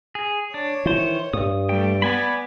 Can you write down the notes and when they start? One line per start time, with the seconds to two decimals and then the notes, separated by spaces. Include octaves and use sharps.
0.15 G#4
0.54 D4 C#5
0.86 D#3 E3 C5
1.33 G2 D#6
1.69 G3 A3 G5
2.02 B3 D5 G#5 B5